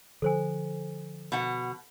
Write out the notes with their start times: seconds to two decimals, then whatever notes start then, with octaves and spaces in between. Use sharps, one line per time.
0.22 D3 F3 A4 C5 G#5
1.32 B2 F#5